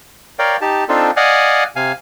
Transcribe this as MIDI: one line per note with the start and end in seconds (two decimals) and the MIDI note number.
0.39 0.57 70
0.39 0.57 73
0.39 0.57 74
0.39 0.57 77
0.39 0.57 79
0.61 0.84 63
0.61 0.84 67
0.61 0.84 81
0.89 1.11 60
0.89 1.11 62
0.89 1.11 63
0.89 1.11 65
0.89 1.11 69
1.16 1.64 74
1.16 1.64 75
1.16 1.64 77
1.16 1.64 78
1.16 1.64 80
1.76 1.92 48
1.76 1.92 77
1.76 1.92 80